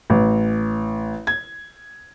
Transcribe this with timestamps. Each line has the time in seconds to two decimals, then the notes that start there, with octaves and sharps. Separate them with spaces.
0.10 A1
1.27 G#6